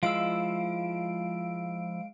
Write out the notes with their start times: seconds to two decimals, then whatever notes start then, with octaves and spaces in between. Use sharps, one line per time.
0.03 F3 G#3 E4 F5 E6 D7